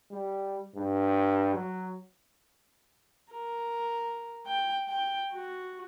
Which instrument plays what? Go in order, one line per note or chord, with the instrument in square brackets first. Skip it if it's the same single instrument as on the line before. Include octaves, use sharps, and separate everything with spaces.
[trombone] G3
G2
F#3
[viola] A#4
G5
G5
F#4